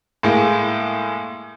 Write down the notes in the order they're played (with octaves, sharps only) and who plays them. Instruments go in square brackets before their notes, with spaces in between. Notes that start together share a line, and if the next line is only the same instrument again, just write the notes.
[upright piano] A2 G#3 A#3